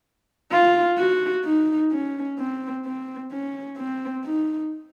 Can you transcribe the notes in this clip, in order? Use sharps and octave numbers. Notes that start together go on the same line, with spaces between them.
F4
F#4
D#4
C#4
C4
C4
C#4
C4
D#4